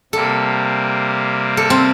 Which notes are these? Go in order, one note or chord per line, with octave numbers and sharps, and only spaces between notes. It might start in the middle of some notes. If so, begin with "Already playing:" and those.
C3 G3 A#3 A4
A4
C4